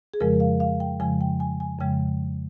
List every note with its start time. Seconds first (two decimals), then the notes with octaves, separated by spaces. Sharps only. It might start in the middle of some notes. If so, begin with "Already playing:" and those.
0.14 G#4
0.20 F2 C#3 F3 G#3 A#4
0.40 F5
0.60 F5
0.80 G5
1.00 F2 C#3 F3 G#3 G#5
1.21 G5
1.40 G#5
1.60 G#5
1.79 F2 C#3 F3 G#3 G5